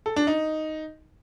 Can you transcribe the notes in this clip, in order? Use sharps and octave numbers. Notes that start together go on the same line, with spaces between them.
A4
D4
D#4